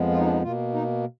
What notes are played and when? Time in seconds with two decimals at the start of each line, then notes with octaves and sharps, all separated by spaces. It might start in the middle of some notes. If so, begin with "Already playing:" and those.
Already playing: F2 F3 G#3 B3
0.11 F4
0.19 D#4
0.26 D4
0.33 D#4
0.43 B2 A#3 F4
0.74 D#4